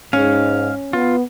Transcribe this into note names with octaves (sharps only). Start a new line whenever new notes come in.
G#2 C#4 F5
B3 F4